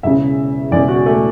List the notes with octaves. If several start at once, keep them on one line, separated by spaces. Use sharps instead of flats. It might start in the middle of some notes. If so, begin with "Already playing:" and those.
E1 E2 C#3 E5
E1 E2 C#3 D5
F#4
A3